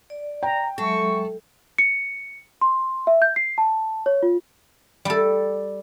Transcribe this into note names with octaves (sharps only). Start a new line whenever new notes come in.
D5
G5 A#5
F#3 G#3 A4 E5 C#6
C#7
C6
E5
G6
C7
A5
C#5
F4
G3 A4